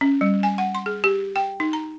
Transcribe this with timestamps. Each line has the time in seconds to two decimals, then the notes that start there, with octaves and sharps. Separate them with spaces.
0.01 C#4
0.21 G3
0.43 G#5
0.58 F#5
0.75 C6
0.86 G#4
1.04 G4
1.36 G5
1.60 D#4
1.73 A#5